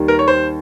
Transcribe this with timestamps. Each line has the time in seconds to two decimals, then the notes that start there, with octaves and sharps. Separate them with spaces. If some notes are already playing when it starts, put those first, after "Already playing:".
Already playing: D#2 D#3 G3
0.08 A#4
0.19 C#5
0.28 C5